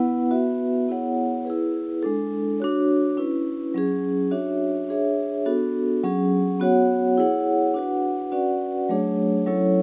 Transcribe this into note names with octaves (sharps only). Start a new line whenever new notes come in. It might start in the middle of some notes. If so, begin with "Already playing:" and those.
Already playing: B3 E4 B4 F#5
B3 F#4 B4 E5
B3 E4 G#4 C#5 F#5
E4 G#4 B4
G#3 D4 A4
D4 F#4 C#5
C#4 E4 B4
F#3 C#4 G#4
D4 F#4 C#5 E5
D4 G#4 C#5 E5
B3 D4 F#4 A4
F#3 C#4 G#4
B3 F#4 C#5 F#5
E4 G#4 C#5 F#5
D4 F#4 B4 F#5
C#4 F#4 B4 D5 F#5
F#3 A3 D4 G#4 C#5
F#3 C#4 E4 A4 C#5